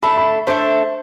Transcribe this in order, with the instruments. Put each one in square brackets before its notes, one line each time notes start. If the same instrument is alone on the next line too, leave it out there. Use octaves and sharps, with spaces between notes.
[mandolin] A3 D4 A4 E5 [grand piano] B5
[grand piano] B5
[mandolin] A3 D4 A4 E5 [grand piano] C5